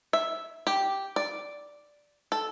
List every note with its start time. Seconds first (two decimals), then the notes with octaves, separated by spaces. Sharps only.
0.13 E5
0.67 G4
1.16 D5
2.32 A4